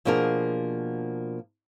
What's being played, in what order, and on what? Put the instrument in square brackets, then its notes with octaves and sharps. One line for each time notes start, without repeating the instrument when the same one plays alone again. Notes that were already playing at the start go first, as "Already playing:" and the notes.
[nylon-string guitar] B2 F3 A#3 D4 G#4 A#4